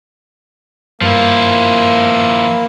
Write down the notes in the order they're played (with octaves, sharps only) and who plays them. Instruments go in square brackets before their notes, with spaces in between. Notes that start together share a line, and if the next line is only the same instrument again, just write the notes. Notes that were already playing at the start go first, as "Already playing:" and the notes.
[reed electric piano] G2 [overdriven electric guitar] F3 E4 [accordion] A#3